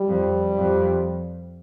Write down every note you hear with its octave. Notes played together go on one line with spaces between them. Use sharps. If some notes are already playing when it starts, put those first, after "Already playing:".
Already playing: G3
F2
F2